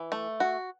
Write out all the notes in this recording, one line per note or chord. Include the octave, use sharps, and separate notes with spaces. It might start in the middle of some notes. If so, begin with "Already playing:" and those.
Already playing: E3
A3
F#4